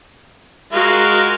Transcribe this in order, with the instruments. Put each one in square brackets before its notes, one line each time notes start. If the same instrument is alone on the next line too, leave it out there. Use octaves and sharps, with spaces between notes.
[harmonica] G#3 F4 [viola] F#4 A#4